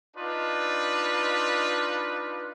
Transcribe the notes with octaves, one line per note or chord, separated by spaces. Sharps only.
D4 D#4 F4 B4